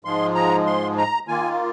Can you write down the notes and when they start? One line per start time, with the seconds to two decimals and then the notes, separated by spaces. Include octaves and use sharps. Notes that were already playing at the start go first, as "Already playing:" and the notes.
0.05 G#2 F3 G#3 C6
0.35 A#5
0.66 C6
0.98 A#5
1.28 D#3 A#3 F4 G#5